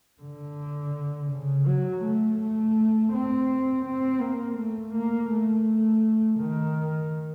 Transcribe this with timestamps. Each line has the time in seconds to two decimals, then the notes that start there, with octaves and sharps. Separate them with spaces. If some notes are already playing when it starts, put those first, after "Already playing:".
0.22 D3
1.32 C#3
1.67 F#3
2.03 A3
2.40 A3
3.13 C4
3.86 C4
4.21 A#3
4.58 A3
4.94 A#3
5.30 A3
6.39 D#3